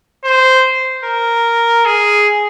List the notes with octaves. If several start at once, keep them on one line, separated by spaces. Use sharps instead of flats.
C5
A#4
G#4